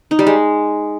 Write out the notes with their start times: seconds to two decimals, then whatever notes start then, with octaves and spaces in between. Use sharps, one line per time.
0.11 D#4
0.19 G3
0.27 G#3